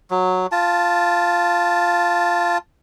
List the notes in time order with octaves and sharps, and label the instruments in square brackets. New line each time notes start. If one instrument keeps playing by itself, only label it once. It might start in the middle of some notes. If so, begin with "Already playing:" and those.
[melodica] F#3
F4 A5